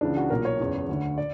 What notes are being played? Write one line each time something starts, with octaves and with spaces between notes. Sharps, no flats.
C#2 C#3 E3 D4
F#4
B1 A#2 A#4
C#5
F#1 E2 C#3 E3
D2 D3
D5